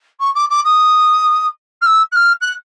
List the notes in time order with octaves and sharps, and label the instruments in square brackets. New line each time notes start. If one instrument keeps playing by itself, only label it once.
[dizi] C#6
D6
D6
D#6
F6
E6
F#6
F6
F#6